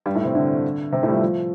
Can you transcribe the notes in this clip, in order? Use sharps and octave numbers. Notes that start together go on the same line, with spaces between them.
G2 G3
A2 A3
C3 C4
D3 D4
C3 C4
A2 A3
G3
F3
F3